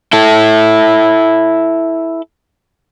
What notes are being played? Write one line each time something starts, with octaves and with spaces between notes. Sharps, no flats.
E4 A4